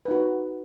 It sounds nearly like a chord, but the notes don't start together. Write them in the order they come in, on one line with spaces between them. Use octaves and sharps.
B4 D#4 F#4